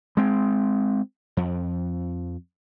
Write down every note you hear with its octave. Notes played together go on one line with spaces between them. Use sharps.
G#3 C4
F2